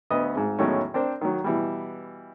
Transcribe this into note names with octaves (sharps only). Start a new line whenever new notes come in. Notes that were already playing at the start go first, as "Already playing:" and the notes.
D2 B3 D#5 D#6
G#1 G#2
E2 A2 D#3 F#3 G#3 C#4
C4 D4 A#4 C5
D#3 F#3
B2 E3 G3